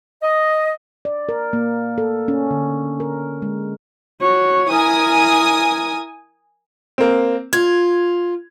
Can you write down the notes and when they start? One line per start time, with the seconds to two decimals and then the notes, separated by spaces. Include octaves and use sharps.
0.22 D#5
1.05 D5
1.29 A#4
1.53 A#3
1.98 A4
2.28 C#4
2.51 D3
3.00 A#4
3.42 G#3
4.22 F#4 C#5
4.70 E4 A#4 G#5 D#6
6.98 A#3 C4
7.53 F4 G#6